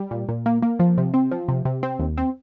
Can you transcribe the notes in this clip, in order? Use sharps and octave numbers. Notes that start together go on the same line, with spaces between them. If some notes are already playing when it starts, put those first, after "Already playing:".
Already playing: G3
A#2
A#2
A#3
A#3
F3
C3
C4
F3
C3
C3
C4
D#2
C4